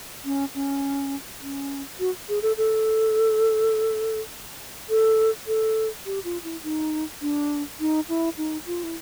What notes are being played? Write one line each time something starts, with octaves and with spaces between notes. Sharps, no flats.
C#4
C#4
C#4
F#4
G#4
A4
A4
A4
A4
G4
F4
E4
D#4
D4
D#4
E4
D#4
F4
E4